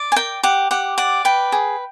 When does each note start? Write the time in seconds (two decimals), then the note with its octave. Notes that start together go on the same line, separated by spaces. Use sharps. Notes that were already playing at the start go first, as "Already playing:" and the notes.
Already playing: D5
0.12 G#5
0.16 A#4 G5
0.43 G4 F#5
0.71 G4 F#5
0.98 D5 F#5
1.25 B4 G5
1.52 G#4